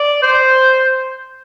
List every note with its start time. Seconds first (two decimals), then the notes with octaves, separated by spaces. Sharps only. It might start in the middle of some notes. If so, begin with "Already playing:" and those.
Already playing: D5
0.22 C5